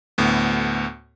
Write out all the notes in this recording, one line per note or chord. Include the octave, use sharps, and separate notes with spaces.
D2 A2 B3